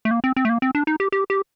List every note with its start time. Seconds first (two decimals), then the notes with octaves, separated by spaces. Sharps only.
0.05 A3
0.11 A#3
0.24 C4
0.36 C4
0.45 A3
0.49 A#3
0.62 C4
0.75 D4
0.87 D#4
1.00 G4
1.12 G4
1.30 G4